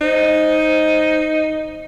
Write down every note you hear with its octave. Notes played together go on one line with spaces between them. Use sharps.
D#4 C5